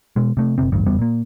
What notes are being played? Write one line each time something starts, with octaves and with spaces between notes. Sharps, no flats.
B2 G#3
C3 A3
F#1 B1 C3 C4
D1 A1 G2
F#1 E2 G3 B3
A#2 A#3